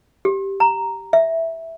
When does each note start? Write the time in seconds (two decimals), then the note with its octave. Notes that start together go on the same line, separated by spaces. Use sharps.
0.25 G4
0.60 A#5
1.13 E5